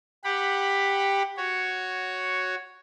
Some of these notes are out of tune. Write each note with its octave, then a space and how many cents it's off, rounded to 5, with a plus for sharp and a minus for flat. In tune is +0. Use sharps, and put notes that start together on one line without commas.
G4 +10 F#5 +0 B5 +0
F#4 +0 C#5 +0